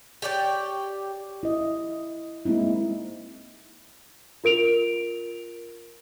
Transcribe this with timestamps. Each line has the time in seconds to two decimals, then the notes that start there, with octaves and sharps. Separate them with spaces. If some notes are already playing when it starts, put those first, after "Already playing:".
0.22 G4 C#5 D5 G5
1.43 E4 D#5
2.45 G#3 A#3 C4 D#4 E4
4.44 F4 A#4 D7 F7